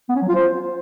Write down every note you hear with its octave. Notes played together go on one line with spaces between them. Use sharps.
B3
C#4
F#3
F4
C5